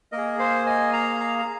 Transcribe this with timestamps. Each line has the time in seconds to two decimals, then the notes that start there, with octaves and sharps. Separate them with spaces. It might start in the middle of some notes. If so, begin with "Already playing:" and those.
0.12 A#3 A#4 D#5
0.17 G#4
0.39 C5 F5
0.66 D#5 G#5
0.93 F5 A#5
1.20 F5 A#5
1.39 A#5